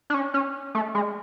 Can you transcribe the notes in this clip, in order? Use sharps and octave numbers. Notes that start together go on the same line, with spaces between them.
D4
C#4
C#4
A3
G#3